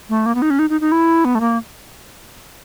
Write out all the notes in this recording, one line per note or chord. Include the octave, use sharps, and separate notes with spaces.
A3
A#3
B3
D#4
C#4
D#4
D#4
D#4
E4
B3
A3
A#3